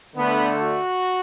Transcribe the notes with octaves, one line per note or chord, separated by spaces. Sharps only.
D3 A3 B3
F#4